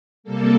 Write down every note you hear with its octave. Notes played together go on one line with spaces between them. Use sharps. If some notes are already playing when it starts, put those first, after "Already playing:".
C3 G3 A#3 A4